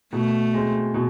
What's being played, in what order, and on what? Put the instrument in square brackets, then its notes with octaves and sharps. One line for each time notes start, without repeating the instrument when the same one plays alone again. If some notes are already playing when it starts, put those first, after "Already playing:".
[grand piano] B2 [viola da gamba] A3
[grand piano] G#3 C4
B2